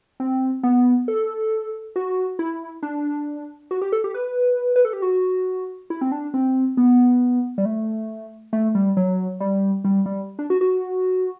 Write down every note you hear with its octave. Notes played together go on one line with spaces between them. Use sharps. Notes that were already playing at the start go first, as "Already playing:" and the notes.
C4
B3
A4
F#4
E4
D4
F#4
G4
A4
G4
B4
B4
A4
G4
F#4
E4
C4
D4
C4
B3
G3
A3
A3
G3
F#3
G3
G3
G3
D4
F#4
F#4